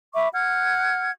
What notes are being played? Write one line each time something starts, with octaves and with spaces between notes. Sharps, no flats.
E5 B5 C#6 D6
F#5 F6 G#6